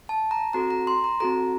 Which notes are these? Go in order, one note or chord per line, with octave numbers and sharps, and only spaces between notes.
A5
A#5
C4 F#4 A4 A#5
A#5
C6
A#5
C4 F#4 A4 A#5